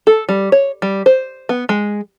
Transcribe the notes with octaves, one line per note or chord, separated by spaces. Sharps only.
A4
G3
C#5
G3
C5
B3
G#3